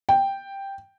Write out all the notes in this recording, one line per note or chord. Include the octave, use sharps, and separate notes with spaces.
G5